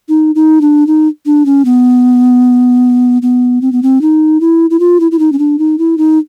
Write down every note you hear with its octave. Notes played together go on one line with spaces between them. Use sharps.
D#4
D#4
D4
D#4
D4
C#4
B3
B3
C4
B3
C4
D#4
E4
E4
F4
E4
E4
D#4
C#4
D4
D#4
E4
D#4